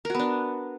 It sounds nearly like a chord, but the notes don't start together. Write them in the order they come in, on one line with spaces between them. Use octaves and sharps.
A#4 F#4 B3 D4